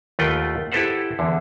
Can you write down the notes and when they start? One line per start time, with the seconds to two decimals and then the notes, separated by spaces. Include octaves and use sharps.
0.19 D#2 A3 F4 B4 F#5 G5
0.72 E4 G4 A4 B4 C5 F#5
1.19 E2 D3